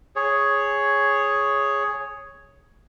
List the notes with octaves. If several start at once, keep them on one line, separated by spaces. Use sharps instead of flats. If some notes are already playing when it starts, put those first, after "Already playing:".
G#4 C#5